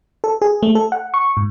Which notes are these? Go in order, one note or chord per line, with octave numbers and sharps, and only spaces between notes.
A4
G#4
A3
A4
F#5
C#6
G#2